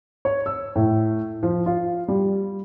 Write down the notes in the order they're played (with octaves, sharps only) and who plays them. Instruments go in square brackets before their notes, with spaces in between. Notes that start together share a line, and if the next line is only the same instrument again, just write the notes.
[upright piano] C#5
E6
A2
F3
F4
G3